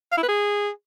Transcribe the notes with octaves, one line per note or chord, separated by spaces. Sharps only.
F5
E4
B4
G#4